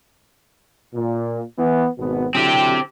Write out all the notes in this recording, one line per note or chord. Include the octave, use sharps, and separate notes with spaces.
A#2
E3 B3
G#1 B2 B3
D3 F#3 C4 E4 G4